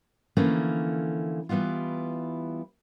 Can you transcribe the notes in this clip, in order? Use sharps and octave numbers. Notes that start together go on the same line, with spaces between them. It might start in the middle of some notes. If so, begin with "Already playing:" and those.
D3 E3 F3 A3 A#3 C#4
E3 G3 B3 E4 F4